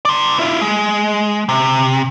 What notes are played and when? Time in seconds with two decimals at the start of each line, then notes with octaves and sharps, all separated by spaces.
0.05 D5 C6
0.39 E4 F4
0.61 G#3
1.49 C3